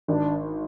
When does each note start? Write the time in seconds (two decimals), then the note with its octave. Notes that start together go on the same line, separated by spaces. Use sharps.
0.08 G#1 D4